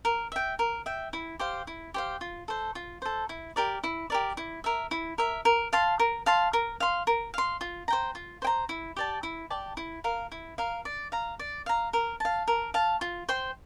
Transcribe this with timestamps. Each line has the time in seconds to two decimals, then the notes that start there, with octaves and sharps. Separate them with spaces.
0.05 A#4
0.32 E5 G5
0.59 A#4
0.86 E5 G5
1.13 E4
1.39 G4 C5 F5
1.67 E4
1.94 G4 C5 F5
2.21 F4
2.48 A4 C5
2.75 F4
3.02 A4 C5
3.29 E4
3.56 G4 A#4 D5
3.84 E4
4.10 G4 A#4 D5
4.37 E4
4.64 A#4 E5
4.91 E4
5.18 A#4 E5
5.45 A#4
5.73 F5 A5 C6
5.99 A#4
6.26 F5 A5 C6
6.53 A#4
6.80 F5 C6
7.07 A#4
7.34 F5 C6
7.61 F4
7.88 C5 G5 A#5
8.15 F4
8.42 C5 G5 A#5
8.69 E4
8.96 G4 D5 A5
9.23 E4
9.50 G4 D5 A5
9.77 E4
10.04 A#4 F5
10.32 E4
10.58 A#4 F5
10.85 D5
11.12 F5 A#5
11.39 D5
11.66 F5 A#5
11.93 A#4
12.20 F5 A5
12.48 A#4
12.74 F5 A5
13.01 F4
13.29 C5 G5 C6